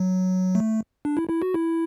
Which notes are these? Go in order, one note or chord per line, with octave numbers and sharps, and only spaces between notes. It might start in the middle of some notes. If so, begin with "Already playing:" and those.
Already playing: F#3
A3
D4
E4
E4
F#4
E4